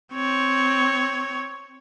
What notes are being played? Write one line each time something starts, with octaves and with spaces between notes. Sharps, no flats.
C4 C#5